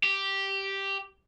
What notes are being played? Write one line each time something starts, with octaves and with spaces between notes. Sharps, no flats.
G4